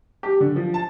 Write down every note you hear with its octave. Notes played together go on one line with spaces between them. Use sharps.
G4
D3
F3
A5